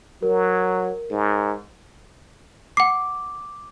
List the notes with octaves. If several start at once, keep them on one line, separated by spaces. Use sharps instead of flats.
F#3 A#4
G#2
F#5 D6 C7